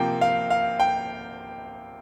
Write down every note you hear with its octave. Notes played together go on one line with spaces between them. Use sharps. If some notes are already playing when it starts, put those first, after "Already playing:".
Already playing: C3 F3 A#3 G5
F5
F5
G5